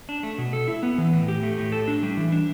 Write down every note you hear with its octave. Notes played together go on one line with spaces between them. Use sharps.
D4
A3
B2
A4
E4
B3
E3
A2
G4
A3
A2
A4
D4
G3
E3
D4